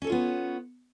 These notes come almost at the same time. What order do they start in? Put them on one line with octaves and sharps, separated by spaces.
C#4 A4 C#5 F4 B3